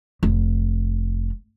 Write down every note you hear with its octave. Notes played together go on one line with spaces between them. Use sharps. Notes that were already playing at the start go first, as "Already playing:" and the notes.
F1